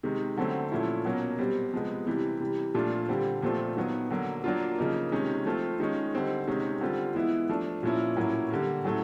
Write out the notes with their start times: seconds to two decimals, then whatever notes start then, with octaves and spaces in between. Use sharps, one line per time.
0.03 C3 D#3 G#3
0.37 D3 F#3 A3 C4
0.71 A#2 F3 A3 C#4 E4
1.05 B2 F#3 A#3 C#4
1.38 B2 G3 C4
1.73 C3 F3 G#3 B3
2.07 C3 E3 G3
2.40 C3 E3 G3
2.74 A#2 F3 A3 D4 F4
3.09 D3 G3 C4
3.42 A#2 F3 A3 C4 F4
3.77 D#3 F#3 B3
4.10 D3 F#3 A#3
4.44 F#3 A#3 D4 F4
4.78 C#3 F3 A#3 D#4
5.12 C3 D#3 G#3 C#4
5.46 F3 A3 C4 F4
5.80 D#3 G#3 C#4
6.13 D3 G3 C4 D#4
6.47 C3 D#3 G#3 C#4
6.81 D3 G3 C4 F4
7.15 E3 G#3 B3 E4
7.50 F3 A3 D4
7.83 A#2 F3 A#3 C#4 E4
8.17 A2 F#3 A#3 C#4 E4
8.50 D3 G3 A#3
8.84 A2 F#3 A3 C#4